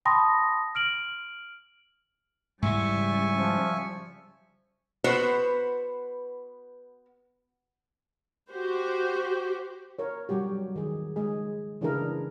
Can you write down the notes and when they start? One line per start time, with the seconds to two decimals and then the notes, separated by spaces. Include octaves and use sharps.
0.05 G5 A5 B5 C6 D#6 A#6
0.75 F6 D7 F#7
2.62 G#2 C#3 E3 G3 E5 G#5 C#6
3.31 F3
5.04 B3 F#4 B4 C5
8.51 F#4 G4 C5
9.99 A#4 C#5
10.29 F#3 G3 F#4 G4
10.76 D#3 G#4
11.16 G#3 G#4
11.81 C#3 E3 D4 E4 G#4 A#4